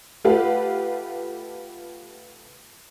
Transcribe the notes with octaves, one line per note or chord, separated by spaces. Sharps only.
A3 F4 G4 B4 F5 F#5